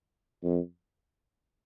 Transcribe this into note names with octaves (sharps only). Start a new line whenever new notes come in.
F2